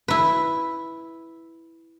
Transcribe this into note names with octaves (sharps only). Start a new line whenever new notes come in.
E4 B4